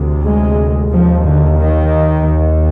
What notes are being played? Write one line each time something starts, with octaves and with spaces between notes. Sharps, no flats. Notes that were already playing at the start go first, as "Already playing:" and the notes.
Already playing: D2 C3
G#3
D#2 F3
D3
D#3
D#2